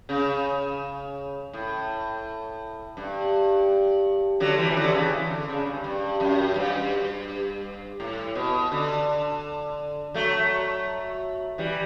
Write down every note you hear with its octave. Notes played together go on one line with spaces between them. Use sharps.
C#3
A2
G2
D3 F#3
E3 G3
E3
D3 F#3
C#3 E3
D3
C#3
G2
G2
F#2
G2
A2
B2
D3
F#3 A3
E3 G3